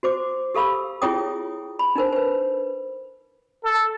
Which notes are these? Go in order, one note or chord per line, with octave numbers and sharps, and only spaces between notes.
F#4 C5 D6
G4 A4 F5 B5 E6
E4 F4 G#4 C#5 G5 D#6
B5
D4 D#4 A#4 C5
B4 C5
A4